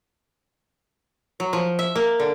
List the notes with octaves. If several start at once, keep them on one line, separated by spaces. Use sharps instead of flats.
F#3
F3
E5
A#3
D3